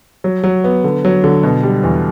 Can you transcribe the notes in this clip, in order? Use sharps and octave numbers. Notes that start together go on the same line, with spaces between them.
F#3
F#3
B3
D3
F#3
D3
B2
G3
E2